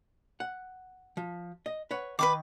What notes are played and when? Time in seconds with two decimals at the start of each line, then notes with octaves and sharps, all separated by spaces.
0.40 F#5
1.17 F3
1.66 D#5
1.91 B4 C#5 F#5
2.19 D#3 B4 B5 D6